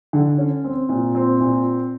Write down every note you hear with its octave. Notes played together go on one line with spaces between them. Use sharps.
D3
C#4
C4
A#2
C4
A#2